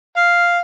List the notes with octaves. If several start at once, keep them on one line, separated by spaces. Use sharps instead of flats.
F5